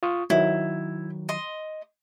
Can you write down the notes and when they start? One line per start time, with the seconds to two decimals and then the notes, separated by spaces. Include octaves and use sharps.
0.03 F4 C#6 D#6
0.30 D#3 F#3 E4
1.29 D#5 C6